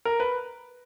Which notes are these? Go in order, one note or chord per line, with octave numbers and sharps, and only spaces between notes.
A#4
B4